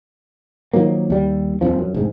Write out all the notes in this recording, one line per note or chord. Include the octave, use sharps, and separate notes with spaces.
D#3 F3 F#3 A#3
D#2 G3
D#1 G#1 F2 F3
F#2
F1 G#2